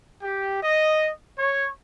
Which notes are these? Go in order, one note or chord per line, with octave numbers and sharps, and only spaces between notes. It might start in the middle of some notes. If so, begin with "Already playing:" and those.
G4
D#5
C#5